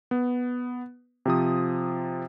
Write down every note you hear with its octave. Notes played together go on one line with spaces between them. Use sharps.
B3
C3 F3 D#6